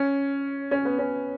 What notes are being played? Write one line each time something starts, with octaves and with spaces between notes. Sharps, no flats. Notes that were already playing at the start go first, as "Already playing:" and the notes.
Already playing: C#4
C#4
B3
C#4